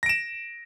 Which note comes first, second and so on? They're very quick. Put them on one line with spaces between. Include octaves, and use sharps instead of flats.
A#6 D7 E7